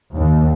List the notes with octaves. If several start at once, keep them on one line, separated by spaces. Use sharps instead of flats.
D#2